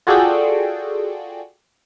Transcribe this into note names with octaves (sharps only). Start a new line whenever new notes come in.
F4 F#4 G#4 A4 D5 G5